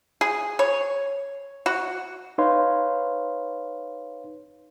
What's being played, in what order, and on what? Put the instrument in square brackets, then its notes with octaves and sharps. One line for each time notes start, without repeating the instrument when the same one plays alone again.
[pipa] G#4
C#5
F#4
[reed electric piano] D#4 B4 C#5 F5 C6